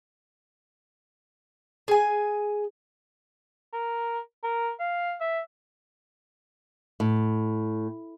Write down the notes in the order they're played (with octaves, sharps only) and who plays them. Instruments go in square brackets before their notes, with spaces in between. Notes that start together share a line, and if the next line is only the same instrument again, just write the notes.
[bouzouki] G#4 G#5
[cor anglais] A#4
A#4
F5
E5
[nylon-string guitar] A2